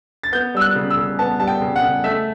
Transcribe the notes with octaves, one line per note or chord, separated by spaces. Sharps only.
A6
B3 G6
G3 E6
F#6
C#3
E6
C#3
B3 A5
G3 A5
G5
C#3
F#5
C#3
A3 E5